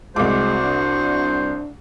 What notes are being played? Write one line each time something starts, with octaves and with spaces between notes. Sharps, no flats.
C2 G#3 F#4 C5 D6
D4